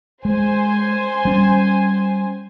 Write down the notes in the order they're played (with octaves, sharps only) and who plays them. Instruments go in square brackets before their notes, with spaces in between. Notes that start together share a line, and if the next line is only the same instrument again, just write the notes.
[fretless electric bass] G#3 [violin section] C5 G#5
[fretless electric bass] G3 C#4